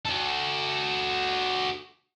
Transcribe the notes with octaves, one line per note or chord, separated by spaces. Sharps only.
F#4 A4